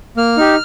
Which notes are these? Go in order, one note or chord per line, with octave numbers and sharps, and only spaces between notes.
A#3 F6
D#4 G4